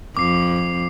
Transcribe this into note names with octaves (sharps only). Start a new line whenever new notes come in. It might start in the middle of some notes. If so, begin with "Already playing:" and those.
F2 D6 C7